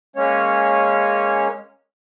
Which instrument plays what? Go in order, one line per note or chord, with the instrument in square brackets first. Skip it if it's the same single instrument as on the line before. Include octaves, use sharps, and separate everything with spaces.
[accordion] G#3 A#3 C#4 C#5